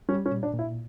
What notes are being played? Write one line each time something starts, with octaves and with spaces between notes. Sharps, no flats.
G3 C#4
C#4
A#2
D4
A#2
E4